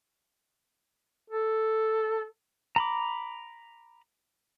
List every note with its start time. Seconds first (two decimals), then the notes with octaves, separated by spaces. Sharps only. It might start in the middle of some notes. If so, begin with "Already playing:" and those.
1.30 A4
2.76 A#5 B5 D6